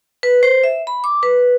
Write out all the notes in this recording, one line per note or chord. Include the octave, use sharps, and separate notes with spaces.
B4
C5
E5
B5
D6
B4